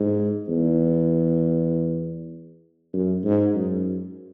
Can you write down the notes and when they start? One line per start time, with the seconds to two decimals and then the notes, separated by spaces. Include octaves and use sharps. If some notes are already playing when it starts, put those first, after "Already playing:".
Already playing: G#2
0.48 E2
2.93 F#2
3.24 G#2
3.55 F#2